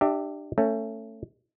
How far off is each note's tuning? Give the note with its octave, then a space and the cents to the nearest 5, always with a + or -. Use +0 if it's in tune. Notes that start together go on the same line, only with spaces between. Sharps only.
D4 +30 G4 +0 E5 +0
A3 +20 C#4 +0